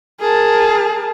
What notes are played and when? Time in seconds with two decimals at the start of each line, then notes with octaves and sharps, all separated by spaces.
0.21 G#4 A#4 A5